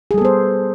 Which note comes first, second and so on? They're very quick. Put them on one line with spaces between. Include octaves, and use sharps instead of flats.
G#4 G3 A4 B3 C5